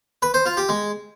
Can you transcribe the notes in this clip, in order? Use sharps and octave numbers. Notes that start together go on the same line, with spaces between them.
B4
C5
F4
G4
G#3